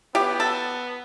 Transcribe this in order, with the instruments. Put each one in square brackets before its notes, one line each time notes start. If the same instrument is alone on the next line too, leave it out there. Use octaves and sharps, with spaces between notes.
[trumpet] B3 [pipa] G4
[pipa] A4